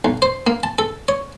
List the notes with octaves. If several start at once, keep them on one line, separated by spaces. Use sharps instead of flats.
B1
C5
A#3
A5
A4
C#5